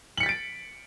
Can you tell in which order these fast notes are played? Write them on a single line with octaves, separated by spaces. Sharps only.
F#7 C#7 B6 A6 D7